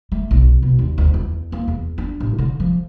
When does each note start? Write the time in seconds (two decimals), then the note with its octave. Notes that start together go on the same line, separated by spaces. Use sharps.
0.12 A3
0.31 B1
0.63 B2
0.79 D#2
0.98 D2
1.14 E2
1.52 A#3
1.68 E2
1.98 D4
2.20 A1
2.38 D3
2.60 F3